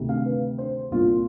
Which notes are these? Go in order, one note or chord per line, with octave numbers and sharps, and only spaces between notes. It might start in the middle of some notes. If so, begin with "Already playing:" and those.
Already playing: D2 C3 D#3
F5
B4
C5
C2 A#2 F4